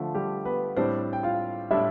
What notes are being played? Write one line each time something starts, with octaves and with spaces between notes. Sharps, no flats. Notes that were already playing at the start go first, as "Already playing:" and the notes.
Already playing: D3 F3 A3 F4
G3 G4
B3 B4
A2 G3 C4 D4 C5
G5
F4 F5
A2 G3 D4 E4 E5